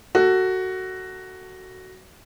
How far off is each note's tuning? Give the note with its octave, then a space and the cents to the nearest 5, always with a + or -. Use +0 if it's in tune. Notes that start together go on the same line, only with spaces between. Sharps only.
F#4 +10 A4 +25